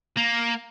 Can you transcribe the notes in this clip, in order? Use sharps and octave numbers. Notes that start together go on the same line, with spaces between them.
A#3